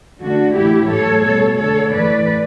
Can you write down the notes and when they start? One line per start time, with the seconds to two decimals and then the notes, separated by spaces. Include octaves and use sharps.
0.21 D3 A3 D4 F#4
0.56 A2 E3 A3 E4 G4
0.90 A2 F#3 A3 A4 C#5
1.24 B2 G3 A4 C#5
1.59 D3 A3 A4 C#5
1.93 A2 E3 A3 B4 D5